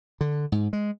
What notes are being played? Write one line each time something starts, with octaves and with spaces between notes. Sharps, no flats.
D3
G#2
G#3